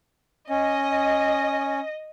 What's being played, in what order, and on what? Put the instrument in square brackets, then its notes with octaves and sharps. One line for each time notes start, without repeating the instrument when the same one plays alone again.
[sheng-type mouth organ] C#4 [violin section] D#5